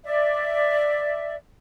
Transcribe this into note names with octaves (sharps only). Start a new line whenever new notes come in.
D5 E5